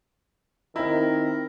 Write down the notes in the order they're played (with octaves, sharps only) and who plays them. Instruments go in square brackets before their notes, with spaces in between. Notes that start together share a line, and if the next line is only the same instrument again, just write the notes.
[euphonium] D#3 [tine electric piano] C4 D#4 [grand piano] E4 [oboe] A#4